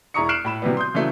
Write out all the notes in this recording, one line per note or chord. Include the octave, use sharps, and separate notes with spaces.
E1 E4 A#5 C#6 D#6 C#7
F6 F#6 C7 D7 E7 F#7
A2 B5 E7
C3 E3 F#3 G3 B3
C6 D#6 G6
C#3 E3 F#3 A3